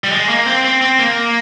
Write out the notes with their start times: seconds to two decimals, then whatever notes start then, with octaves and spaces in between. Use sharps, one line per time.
0.04 G3
0.11 G#3
0.29 A#3
0.46 C4
0.65 C4
0.81 C4
0.99 A#3